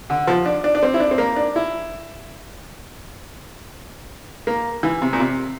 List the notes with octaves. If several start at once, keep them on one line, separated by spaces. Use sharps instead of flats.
D3
F3
D4
D4
D4
C4
E4
D4
C4
A#3
D4
E4
A#3
E3
C3
A#2
C3